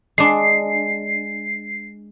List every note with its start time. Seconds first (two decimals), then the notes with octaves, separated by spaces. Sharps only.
0.18 G#3 D4 C7